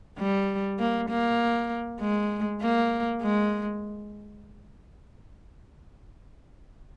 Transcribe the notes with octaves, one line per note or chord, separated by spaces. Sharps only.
G3
A#3
A#3
G#3
A#3
G#3